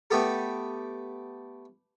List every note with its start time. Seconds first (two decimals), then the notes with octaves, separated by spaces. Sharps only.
0.11 A3 B3 G4 A4